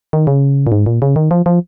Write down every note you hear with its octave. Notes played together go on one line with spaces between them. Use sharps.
D#3
C#3
A#2
G#2
A#2
C#3
D#3
F3
F3